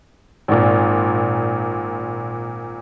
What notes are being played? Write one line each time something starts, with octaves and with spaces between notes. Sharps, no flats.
G#1 A#2